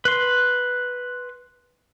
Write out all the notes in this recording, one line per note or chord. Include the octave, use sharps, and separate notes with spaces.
B4 C6